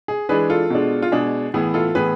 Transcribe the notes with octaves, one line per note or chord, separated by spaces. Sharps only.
G#4
E3 G#3 D4 G#4 B4
F4 A4
B2 G#3 D4
F4
B2 G#3 D4 G#4
A2 E3 B3 G#4
F4 A4
A2 E3 B3 G#4 B4